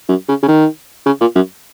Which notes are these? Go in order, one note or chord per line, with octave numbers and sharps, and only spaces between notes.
F#2
C#3
C#3
D#3
C#3
A#2
F#2